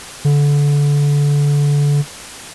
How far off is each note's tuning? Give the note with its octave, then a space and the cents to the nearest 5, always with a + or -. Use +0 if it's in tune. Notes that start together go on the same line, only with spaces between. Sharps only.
D3 -25